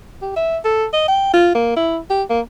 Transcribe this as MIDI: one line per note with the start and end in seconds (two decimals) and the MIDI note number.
0.22 0.35 67
0.36 0.58 76
0.65 0.86 69
0.93 1.04 75
1.08 1.33 79
1.34 1.54 65
1.55 1.74 58
1.77 1.98 64
2.10 2.23 67
2.30 2.40 58